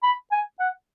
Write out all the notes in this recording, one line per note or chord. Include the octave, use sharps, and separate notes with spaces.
B5
G#5
F#5